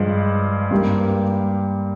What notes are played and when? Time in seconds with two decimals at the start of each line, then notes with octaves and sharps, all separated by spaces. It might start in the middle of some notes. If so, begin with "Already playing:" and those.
Already playing: G2 F3 G#3
0.71 G2 G3 A#3